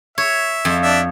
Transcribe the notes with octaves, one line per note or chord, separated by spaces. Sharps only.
C#5 E5
F2
D4 E5